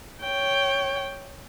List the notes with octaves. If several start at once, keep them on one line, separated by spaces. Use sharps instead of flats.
C#5 G5